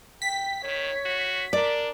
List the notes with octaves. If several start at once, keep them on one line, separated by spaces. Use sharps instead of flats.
G5 B6
D#3 C#5
F#4
D4 A#4 D5